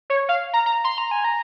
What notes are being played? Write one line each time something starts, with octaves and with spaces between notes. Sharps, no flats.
C#5
F5
A#5
A#5
C6
A#5
G#5
A#5